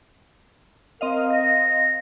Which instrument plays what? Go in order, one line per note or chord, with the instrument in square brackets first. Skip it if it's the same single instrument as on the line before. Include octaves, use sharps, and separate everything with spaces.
[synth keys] C4 D#5 F5 [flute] A#4
[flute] A#6